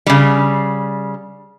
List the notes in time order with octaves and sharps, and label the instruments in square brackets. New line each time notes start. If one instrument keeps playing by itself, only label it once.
[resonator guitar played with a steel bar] C#3 G3